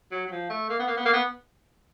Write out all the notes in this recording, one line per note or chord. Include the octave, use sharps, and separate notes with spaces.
F#3
F#3
F3
A3
A#3
B3
A#3
B3
A#3
B3